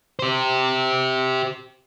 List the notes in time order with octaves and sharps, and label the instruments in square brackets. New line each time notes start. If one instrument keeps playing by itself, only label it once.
[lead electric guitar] G4 C5